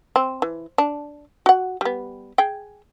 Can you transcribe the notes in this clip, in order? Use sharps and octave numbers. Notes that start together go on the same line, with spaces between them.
C4
E3
D4
F#4 F#5
G3 B3
G#4 G5